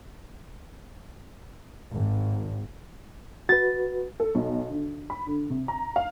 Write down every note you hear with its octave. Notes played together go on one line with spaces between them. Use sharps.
G#1
F#4 B4 A6
A4
B1
D3
B5
D3
C3
A#5
F5